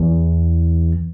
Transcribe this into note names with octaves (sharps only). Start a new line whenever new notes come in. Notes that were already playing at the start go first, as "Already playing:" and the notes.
Already playing: E2